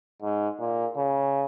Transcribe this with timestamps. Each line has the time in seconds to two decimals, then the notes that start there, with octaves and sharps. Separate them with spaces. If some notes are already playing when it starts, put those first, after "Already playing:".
0.22 G#2
0.60 A#2
0.97 C#3